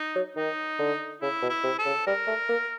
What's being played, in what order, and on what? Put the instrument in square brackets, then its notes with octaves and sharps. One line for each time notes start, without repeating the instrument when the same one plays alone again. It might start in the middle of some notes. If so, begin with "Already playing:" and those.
Already playing: [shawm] D#4
[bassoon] F#3
[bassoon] D#3 [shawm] D#4
[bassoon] D3
[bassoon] C#3 [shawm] E4
[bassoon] B2
[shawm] E4
[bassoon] C3
[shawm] A4
[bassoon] C#3
[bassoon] G3 [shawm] A#4
[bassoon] A3
A#3